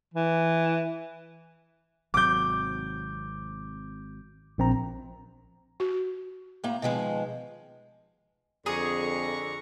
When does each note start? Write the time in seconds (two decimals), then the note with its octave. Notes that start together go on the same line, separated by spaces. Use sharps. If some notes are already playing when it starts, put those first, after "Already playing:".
0.14 E3
2.14 G#1 C3 F#3 D6 G6
4.58 A#1 C4 A#5
5.80 F#4
6.64 A2 A#3 A#5
6.82 B2 D#3 F3 G#3
8.66 F2 D3 G#4 A#5 C#6 D#6